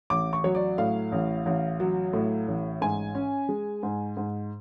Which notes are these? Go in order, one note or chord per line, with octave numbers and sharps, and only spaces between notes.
A1 D6
C#6
F#3 C#5
D5
A2 F5
A1
A1
F#3
A2
A1
G#2 G#5
C#4
G#3
G#2
G#2